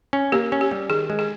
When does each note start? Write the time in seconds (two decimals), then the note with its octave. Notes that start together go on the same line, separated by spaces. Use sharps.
0.13 C#4
0.32 A#3 G4
0.52 C#4
0.61 G4
0.71 G3
0.90 D#3 G#4
1.10 G#3
1.19 G#4